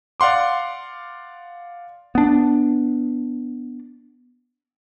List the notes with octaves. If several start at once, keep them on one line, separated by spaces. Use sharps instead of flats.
D5 F5 F#5 C6 D6
B3 D4